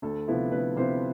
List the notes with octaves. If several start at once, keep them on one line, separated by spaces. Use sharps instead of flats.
D2 A4
C3 F3 B3 E4
D2 B4
C3 F3 B3 E4 C5